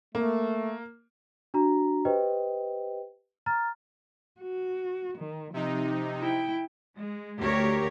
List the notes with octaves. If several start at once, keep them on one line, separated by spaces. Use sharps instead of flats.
A3 A#3
D4 F#4 A#5
G4 B4 C5 D#5 G5
A#5 F6 A6
F#4
D#3
C3 F3 D#4
E4 G5
G#3
D2 G4 A#4 C#5